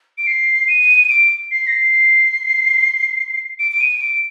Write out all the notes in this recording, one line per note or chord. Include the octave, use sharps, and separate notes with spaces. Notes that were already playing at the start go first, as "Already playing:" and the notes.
D7
C7
D#7
D7
C7
A#6
C7
D7
D7
D#7
D7